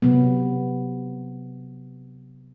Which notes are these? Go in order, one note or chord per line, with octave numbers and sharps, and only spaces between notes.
C3 F#3 B3